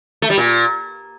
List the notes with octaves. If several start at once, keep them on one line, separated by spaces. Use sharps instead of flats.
A3
G3
A#2